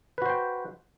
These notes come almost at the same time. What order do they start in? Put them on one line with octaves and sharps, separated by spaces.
B4 F#4 C5 G5